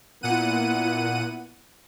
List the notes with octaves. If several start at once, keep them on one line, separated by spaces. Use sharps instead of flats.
A#2 B3 E4 F#5 D#7